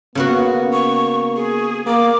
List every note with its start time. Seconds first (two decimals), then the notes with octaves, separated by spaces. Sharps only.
0.15 C#3 A#3 B3 F#4
0.73 C#6
1.36 G#4
1.86 A#3 D6